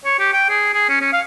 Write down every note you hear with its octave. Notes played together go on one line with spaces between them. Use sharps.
C#5
G4
G5
G#4
G#4
C#4
C#4
F5